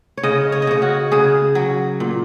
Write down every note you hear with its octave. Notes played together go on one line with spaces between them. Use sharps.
C#5
C#3 D#5
C#5
D#5
C#3 C#5
F#4
C#3 G#4
F#3
A#2